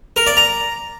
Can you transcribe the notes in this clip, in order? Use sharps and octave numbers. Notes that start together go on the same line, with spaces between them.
A#4
D5
A#5